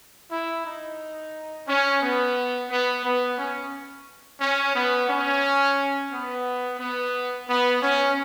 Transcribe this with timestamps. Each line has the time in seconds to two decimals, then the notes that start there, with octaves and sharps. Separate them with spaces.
0.30 E4
0.65 D#4
1.68 C#4
2.01 B3
2.70 B3
3.04 B3
3.38 C#4
4.41 C#4
4.75 B3
5.09 C#4
6.12 B3
6.80 B3
7.48 B3
7.82 C#4